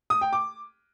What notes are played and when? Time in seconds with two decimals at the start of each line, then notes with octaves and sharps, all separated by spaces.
0.10 D#6
0.21 G5
0.33 D6